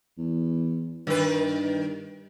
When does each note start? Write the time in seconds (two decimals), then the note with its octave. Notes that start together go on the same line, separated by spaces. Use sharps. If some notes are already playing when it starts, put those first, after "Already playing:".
0.18 E2
1.07 G2 D#3 B4